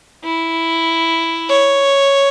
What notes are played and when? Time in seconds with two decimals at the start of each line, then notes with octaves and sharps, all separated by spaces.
0.24 E4
1.50 C#5